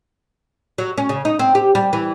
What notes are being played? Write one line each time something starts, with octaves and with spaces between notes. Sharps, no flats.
F#3
C#4
C#3
D#4
C4
G4
G3
E3